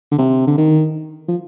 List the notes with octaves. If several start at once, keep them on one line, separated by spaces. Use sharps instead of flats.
D3
C3
D3
D#3
F3